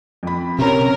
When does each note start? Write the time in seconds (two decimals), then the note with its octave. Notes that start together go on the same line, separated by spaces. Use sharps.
0.23 F2 B5
0.59 C3 C4 C#4 A#4